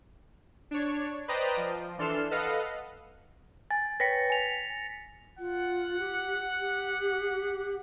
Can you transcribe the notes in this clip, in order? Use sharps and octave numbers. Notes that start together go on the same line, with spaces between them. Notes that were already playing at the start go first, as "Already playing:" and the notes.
D4 C#5
B4 C5 D5 D#5 G5 A#5
F3
E3 D4 A4 C6 F6 E7
A4 B4 D#5 F5 F#5
G#5 A6
B4 C#5 G5 A#6 B6 C#7
G#5 C#7 F7
F4 F#5
G4
G4